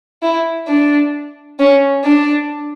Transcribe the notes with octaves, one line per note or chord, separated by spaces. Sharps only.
E4
D4
C#4
D4